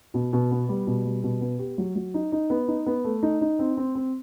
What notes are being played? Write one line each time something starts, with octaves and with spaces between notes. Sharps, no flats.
B2
B2
B3
G3
B2
G3
B2
B3
G4
F#3
F#3
D#4
D#4
B3
D#4
B3
A3
D#4
D#4
C4
C4
C4